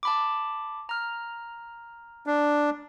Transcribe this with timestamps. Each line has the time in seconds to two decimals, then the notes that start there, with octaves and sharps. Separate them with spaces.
0.03 A5 B5 D6
0.89 A#5 F6
2.26 D4